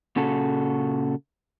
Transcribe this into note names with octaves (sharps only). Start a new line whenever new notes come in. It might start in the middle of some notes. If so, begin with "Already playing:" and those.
A#2 C#3 F#4 A4